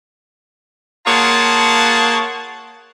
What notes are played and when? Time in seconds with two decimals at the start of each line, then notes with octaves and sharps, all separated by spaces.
1.06 A#3 F4 G#4 C#5 F#5 A5